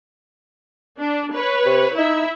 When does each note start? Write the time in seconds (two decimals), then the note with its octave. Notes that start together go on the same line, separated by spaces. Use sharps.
1.00 D4
1.34 B4 C#5
1.65 C3
1.98 D#4 E4 E5